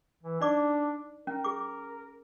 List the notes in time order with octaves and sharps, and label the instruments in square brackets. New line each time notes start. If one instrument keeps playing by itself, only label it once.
[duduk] E3
[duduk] D4 [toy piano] D#4 D5 D6
[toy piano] C#4 [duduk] A#4
[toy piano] G#4 D6